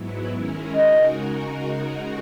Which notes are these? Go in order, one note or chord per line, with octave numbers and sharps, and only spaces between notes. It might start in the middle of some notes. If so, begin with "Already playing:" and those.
Already playing: G#2 F#3 B3 E4
D#3 G#3 C#4 E4 A#4
C#3 G#3 D#4 F#4 A#4 D#5